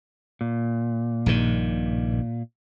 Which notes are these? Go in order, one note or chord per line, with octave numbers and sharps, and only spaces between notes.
A#2
A#1 G2 D#3